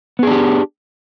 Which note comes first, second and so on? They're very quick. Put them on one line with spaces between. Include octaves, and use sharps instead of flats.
B3 G#4 D4 G4